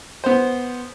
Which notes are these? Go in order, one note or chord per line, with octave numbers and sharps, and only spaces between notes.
B3 C5